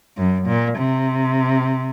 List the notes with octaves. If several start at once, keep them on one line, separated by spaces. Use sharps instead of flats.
F#2
A#2
C3